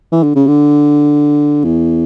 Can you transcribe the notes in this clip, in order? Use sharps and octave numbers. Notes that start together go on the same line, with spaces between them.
E3
D3
C#3
D3
E2